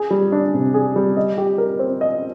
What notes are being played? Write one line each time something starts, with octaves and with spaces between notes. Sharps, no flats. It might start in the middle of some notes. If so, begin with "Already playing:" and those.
Already playing: G#4
G3
D4
C3
G#4
G3
D#5
G4
A#4
C4
D#5